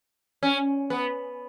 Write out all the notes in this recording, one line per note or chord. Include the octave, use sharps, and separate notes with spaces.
C#4
B3